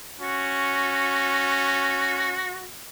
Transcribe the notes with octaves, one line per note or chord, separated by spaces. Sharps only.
C#4 F#4